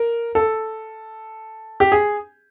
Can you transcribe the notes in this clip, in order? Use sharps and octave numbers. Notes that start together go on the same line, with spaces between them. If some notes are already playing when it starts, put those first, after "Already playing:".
Already playing: A#4
A4
G4
G#4